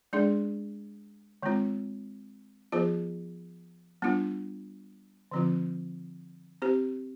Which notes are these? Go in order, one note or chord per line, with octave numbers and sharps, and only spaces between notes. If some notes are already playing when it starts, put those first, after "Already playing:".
G#3 D4 G#4 D5
D#3 G#3 C4 F4
F3 B3 F4 G#4 C5
G3 B3 D4 F4
D3 F3 C4 F4
C4 G4 C5